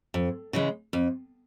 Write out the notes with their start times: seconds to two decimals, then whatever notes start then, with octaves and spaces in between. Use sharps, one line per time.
0.14 F2
0.53 C#3 E3 G#3
0.93 F2